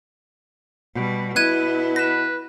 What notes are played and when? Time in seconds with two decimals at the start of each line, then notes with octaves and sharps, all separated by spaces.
0.94 B2 G3
1.36 B2 B3 E4 F#6 G#6 D#7
1.96 B4 A#6 E7